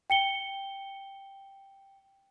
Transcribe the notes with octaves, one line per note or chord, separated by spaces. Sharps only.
G5 C#7 G7